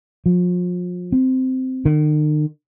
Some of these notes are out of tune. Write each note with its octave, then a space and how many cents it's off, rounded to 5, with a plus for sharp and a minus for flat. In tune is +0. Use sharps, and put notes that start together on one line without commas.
F3 +35
C4 -15
D#3 -45